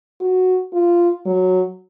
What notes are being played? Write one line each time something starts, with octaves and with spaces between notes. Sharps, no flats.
F#4
F4
F#3